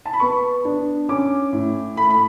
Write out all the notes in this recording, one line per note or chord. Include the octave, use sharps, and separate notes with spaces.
A5
B5
B3 C#6
D4
C#4 D6
A2
A3 B5
B5